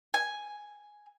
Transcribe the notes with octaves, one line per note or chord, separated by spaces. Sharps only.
G#5